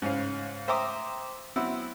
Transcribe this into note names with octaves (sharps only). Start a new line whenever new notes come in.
G#2 C#3 C#4 F5
C5 E5 G5 A#5 D6 D#6
F#3 B3 C4 E4